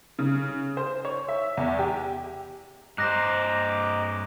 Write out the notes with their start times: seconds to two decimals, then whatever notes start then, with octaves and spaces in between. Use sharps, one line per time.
0.19 C#3
0.77 C5
1.05 C#5
1.28 E5
1.57 E2
1.79 G4
2.98 G2 C5 D#5 A#5 D6 F#6 A#6